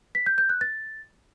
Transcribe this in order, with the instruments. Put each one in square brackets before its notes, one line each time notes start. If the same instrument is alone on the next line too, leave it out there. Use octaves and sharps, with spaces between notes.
[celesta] B6
G6
G6
F#6
A6